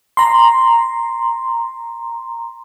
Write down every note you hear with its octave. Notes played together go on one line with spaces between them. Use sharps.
A#5 C6